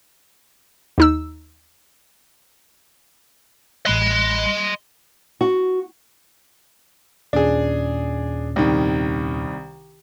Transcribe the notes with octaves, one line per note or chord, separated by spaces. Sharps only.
D#2 D#4 E6
A1 D#5 B5 C6 F#6
F#4
D#2 A#2 C#4 D4 G#4
C2 D#3